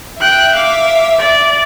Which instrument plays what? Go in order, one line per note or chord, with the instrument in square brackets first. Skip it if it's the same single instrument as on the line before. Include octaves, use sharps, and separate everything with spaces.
[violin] E5 [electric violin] G5 F#6
[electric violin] F5 D6
D5